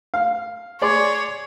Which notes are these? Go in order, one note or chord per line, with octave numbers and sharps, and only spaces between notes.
F5
G#4 C#5 D5 C6